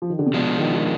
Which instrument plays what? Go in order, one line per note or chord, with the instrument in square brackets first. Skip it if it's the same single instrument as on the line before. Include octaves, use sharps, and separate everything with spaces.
[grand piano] F3
D#3
D3
C3
[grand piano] B2 [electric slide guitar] F3 G#3 D4
[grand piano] D#3
D#3